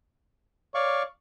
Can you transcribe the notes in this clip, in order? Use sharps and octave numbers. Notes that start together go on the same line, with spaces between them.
C#5 D5 F5 C#6